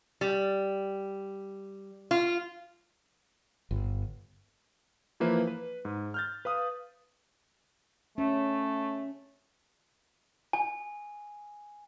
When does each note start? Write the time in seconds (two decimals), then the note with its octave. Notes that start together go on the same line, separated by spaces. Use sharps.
0.21 G3
2.11 F4
3.71 G1
5.20 E3 F3 A#3 E4 B4 C5
5.47 B4
5.85 G#2
6.14 F6 G6 A6
6.45 B4 F5 D#6
8.18 A3 C#4
10.53 G#5